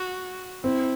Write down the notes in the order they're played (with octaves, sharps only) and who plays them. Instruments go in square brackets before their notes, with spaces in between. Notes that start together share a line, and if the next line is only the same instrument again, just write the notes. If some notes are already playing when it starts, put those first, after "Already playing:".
Already playing: [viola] F#4
[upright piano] C4 [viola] E4